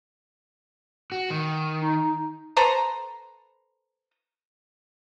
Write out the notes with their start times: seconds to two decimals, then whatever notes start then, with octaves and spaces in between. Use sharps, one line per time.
1.12 F#4
1.30 D#3
1.81 D#4
2.57 A4 B4 C5 A#5